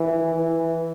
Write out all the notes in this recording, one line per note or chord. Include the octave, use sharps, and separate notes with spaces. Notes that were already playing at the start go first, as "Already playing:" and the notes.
Already playing: E3
E3